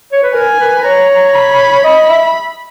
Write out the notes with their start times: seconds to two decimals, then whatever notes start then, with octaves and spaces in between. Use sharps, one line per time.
0.12 C#5
0.23 B4
0.34 A#4 G#5
0.59 B4
0.78 B4
0.84 C#5 A#5
1.34 B5
1.84 D#5 B5
2.09 E5